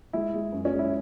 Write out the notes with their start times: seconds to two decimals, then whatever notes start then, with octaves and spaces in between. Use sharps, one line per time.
0.13 G#3 E4
0.34 G#3
0.52 F#2
0.65 C#4
0.72 G#3
0.79 E4